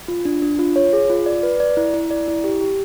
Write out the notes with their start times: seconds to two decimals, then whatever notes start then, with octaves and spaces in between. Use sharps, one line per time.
0.08 F4
0.25 D4
0.42 D4
0.59 F4
0.76 C#5
0.93 G#4
1.10 F4
1.26 D5
1.43 B4
1.60 D5
1.77 E4
1.94 E4
2.11 D5
2.28 E4
2.44 G4
2.61 G4